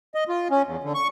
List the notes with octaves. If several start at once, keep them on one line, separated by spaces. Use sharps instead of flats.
D#5
F4
C#4
E2
D3
C#6